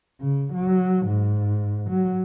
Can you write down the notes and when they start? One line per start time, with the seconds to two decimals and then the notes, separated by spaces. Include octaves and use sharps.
0.21 C#3
0.53 F#3
1.06 G#2
1.90 F#3